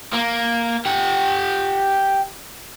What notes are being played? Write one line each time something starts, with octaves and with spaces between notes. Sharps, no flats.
A#3
G4 F#5